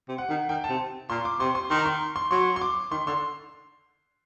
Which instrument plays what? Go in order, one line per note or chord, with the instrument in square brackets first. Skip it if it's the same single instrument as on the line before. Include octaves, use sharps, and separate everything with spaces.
[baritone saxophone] C3
[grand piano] F#5
[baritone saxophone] D#3
[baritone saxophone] D#3 [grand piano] G5
[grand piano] A5
[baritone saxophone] C3
[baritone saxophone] A#2 [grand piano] C6
[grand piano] D6
[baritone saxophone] C3 [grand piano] C6
[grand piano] C6
[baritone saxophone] D#3 [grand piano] C6
[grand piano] A#5
C6
C6
[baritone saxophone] F#3 [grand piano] C6
[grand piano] C6
D6
[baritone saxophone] D#3 [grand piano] C6
[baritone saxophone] D3 [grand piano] C6